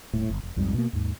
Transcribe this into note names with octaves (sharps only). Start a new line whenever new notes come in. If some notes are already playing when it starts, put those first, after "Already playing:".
D#1 A2
G1
E1
B1 F2 G#2 G3
B2 A#3
D#2 G#2